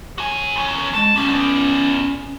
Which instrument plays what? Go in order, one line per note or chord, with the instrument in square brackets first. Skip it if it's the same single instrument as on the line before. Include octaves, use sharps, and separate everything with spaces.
[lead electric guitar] F#4 G#5
E2 C#4
[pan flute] G#3 [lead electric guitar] A5
[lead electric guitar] A#3 F#4 [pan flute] C#4
[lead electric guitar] B3 D5